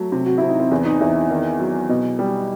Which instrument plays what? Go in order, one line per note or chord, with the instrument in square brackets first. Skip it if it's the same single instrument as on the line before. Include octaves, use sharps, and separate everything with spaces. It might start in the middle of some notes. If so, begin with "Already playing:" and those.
Already playing: [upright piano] F#3 [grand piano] A3
[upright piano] C3
[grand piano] F#4
[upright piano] C3 [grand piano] E4
[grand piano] D#4
C4
[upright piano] E2 [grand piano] B3
[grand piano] D#4
[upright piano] E2 [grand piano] E4
[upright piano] D#3
F#3
B2
G3